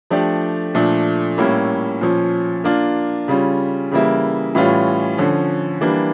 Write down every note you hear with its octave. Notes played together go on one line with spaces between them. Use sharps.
F3 A3 D4 G4 D5
A#2 F3 A3 D4
A2 G3 A#3 C#4 E4
A#2 F3 C#4
A#3 D4 F4
C#3 G3 C#4 F4
C#3 E3 G3 A#3 E4
A2 E3 G3 C#4 F4
D3 F3 C#4
E3 G3 A#3 D4